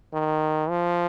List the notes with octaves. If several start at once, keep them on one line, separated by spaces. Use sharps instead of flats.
D#3
F3